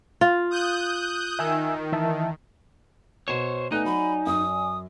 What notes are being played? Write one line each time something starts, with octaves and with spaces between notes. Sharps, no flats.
F4
D#6 F#6 G6
D#3 E5 G#5 E6
E3 E5 A5
B2 C5 C#5 E7
A3 B3 D#4 D5 G#5 F#6
F#3 B5
F#2 D#6